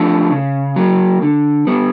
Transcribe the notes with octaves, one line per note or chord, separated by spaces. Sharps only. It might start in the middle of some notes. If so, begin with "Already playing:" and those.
Already playing: F3 A3 D4
C#3
F#3 A#3
D3
G3 B3